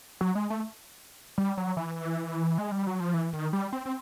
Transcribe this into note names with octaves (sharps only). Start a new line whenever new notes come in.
F#3
G#3
A3
G3
F#3
E3
G#3
G3
F#3
F3
E3
D#3
G3
C4
C4